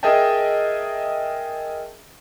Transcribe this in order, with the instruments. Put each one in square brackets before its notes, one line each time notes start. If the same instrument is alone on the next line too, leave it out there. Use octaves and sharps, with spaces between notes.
[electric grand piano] G#4 A#4 D#5 E5 G5 A5